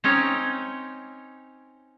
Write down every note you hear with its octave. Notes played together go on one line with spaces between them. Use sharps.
C4 C#4 D#4 C#5